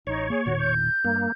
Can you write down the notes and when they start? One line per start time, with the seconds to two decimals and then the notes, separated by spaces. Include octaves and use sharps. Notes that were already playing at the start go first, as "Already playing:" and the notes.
0.07 A1 D#4 C#5
0.30 A#3 G#4
0.46 E1 A#2 D#3 F#4
0.59 G6
1.04 G2 A#3